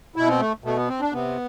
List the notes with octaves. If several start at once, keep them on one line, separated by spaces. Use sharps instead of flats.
B2 E4
C4
A3
B2 A3
B3
C4
D4
C3 B3